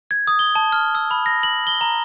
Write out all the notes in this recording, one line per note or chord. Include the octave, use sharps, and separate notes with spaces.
G#6
D#6
G7
A5
F6
E6
B5
A#6
F#7
G7
A#5